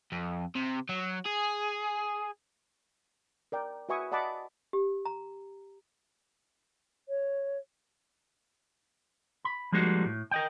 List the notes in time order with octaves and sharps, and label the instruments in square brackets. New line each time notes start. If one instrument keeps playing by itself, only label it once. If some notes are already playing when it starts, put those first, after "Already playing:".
[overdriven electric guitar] F2
C3
F#3
G#4
[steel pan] A#4 D5 G5
F#4 B4 E5 G#5 C#6 D#6
D5 D#5 F#5 A5 B5 D6
[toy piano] G4
A#5
[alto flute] C#5
[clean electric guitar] B5
F3 G3 G#3 A#3 D#4 F#4
A2
A#4 D#5 G5